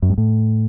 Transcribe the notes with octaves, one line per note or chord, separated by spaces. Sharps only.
F#2
G2
A2